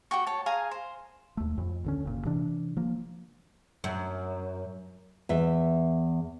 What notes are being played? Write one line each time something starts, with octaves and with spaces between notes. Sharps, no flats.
F#4 G4 G5 C#6
C#5 A5
G#4 F5 G#5 A#5
C5
D#2 A3
F2
D2 D3 C#4
F#1 A#2
C3 E3 D4
F3 A#3
F#2
E2 E5